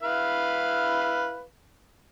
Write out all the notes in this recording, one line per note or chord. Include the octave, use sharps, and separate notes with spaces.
E4 B4 F5